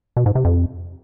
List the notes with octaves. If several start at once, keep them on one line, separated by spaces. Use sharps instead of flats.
B2
G#2
C3
F2